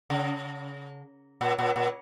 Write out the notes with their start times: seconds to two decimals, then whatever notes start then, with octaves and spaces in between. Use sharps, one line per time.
0.10 C#3
1.41 A#2
1.58 A#2
1.76 A#2